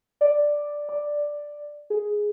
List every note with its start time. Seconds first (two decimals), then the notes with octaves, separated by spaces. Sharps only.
0.21 D5
0.89 D5
1.90 G#4